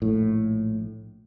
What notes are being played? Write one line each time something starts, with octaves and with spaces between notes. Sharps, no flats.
A#1 A2